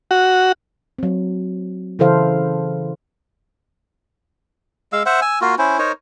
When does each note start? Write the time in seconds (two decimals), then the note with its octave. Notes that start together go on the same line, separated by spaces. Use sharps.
0.11 F#4
0.99 F#3 C4
1.99 C#3 E3 E4 A4 C5 F5
4.93 G#3 F5 E6
5.06 C5 E5 F#5
5.22 G#5 E6
5.41 A#3 F4 F#4
5.58 C#4 E4 C5
5.79 D#4 A#4 C5 C#5